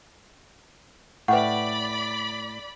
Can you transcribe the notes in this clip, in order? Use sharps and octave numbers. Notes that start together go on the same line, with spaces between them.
A2 B4 D5 E5 F#5 G5 B5 C#6